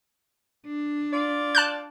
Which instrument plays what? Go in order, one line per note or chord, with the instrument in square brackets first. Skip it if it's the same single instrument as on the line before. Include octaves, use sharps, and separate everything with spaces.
[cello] D4
[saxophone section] F4 D5
[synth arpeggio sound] A5 F#6 G6